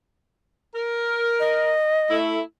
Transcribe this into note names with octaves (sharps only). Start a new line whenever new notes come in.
A#4
D#5
A3 E4